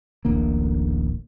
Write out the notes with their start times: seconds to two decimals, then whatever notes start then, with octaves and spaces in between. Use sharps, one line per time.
0.25 D1 A1 D3 A#3